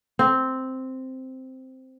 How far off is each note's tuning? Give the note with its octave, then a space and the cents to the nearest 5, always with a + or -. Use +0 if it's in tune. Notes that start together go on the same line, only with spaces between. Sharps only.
C4 -5